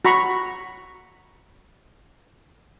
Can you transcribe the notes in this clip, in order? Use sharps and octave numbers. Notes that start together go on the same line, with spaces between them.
F#4 A#5 B5 C#6